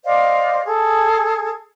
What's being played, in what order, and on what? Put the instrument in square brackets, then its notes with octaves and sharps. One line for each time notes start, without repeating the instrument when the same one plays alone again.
[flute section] C5 D5 D#5 F5
G#4 A4